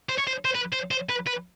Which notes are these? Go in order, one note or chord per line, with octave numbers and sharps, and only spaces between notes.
C5
C#5
C5
C5
B4
C5
C5
B4
B4